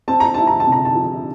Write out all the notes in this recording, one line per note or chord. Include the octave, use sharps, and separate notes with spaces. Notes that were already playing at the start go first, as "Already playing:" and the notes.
C4 A5
A#5
E4 A5
A#5
A5
C3
A#5
A5
F3